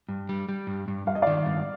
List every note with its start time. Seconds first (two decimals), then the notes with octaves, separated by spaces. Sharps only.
0.09 G2
0.29 G3
0.49 G3
0.67 G2
0.88 G2
1.07 G2 F5
1.15 D#5
1.22 D#3 D5 F5
1.46 G2